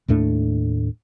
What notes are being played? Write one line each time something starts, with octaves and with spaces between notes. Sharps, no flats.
D#2 A2 A3 D4